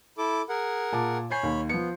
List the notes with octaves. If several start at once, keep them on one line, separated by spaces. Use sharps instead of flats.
E4 A4 D6
G#4 A#4 F#5
A#2 A5 D6
C#5 G#5 B5 G6 C7
D#2
F3 B3 C#7